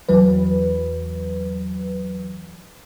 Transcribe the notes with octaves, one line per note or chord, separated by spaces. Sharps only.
E2 E3 F#3 B4